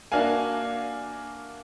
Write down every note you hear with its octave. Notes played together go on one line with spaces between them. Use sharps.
A#3 D4 F#4 E5 F5 G#5